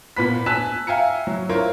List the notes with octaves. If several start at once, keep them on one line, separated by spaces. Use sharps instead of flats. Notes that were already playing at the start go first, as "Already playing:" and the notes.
A#2 B3 B5 B6
G#5 A5 E6 F#6 B6 E7
E5 F5 G5 G#5 A#5 C#7
F#3
E4 F4 A#4 C5 C#5